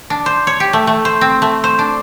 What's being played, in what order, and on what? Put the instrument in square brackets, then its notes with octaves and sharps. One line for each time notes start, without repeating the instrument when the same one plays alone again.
[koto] D4
C5
C#5
G4
A3
A3
C5
C4
A3
C5
D4